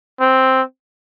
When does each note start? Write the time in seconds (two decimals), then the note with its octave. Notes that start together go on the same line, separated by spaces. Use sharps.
0.20 C4